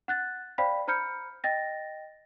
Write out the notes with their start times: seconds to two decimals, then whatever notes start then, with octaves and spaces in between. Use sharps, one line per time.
0.08 F#5 F#6 A6
0.58 C5 D5 F5 G5 B5 B6
0.88 C5 A#5 B5 F6 G6 C#7
1.44 D#5 G5 A6 A#6